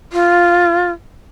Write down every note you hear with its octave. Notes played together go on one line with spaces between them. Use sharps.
F4